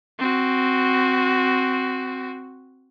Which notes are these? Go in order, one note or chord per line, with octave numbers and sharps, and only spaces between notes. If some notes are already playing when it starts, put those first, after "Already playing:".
C4 F#4